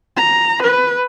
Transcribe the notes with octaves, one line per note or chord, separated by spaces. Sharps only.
A#5
B4